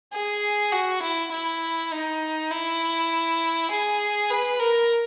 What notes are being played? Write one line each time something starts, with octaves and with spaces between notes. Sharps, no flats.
G#4
F#4
E4
E4
D#4
E4
G#4
B4
A#4